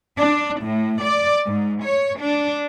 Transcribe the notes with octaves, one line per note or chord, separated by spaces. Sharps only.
D4
A2
D5
G#2
C#5
D4